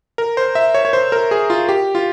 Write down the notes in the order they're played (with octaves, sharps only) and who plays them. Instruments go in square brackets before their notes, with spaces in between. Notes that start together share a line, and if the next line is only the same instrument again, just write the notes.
[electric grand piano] A#4
C5
E5
C#5
C#5
C5
A#4
G#4
F4
G4
F4